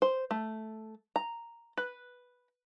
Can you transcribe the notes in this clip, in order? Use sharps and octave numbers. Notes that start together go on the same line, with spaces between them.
C5
A3
A#5
B4